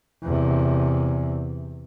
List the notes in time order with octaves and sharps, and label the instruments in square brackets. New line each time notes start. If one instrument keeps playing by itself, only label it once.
[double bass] E2 C3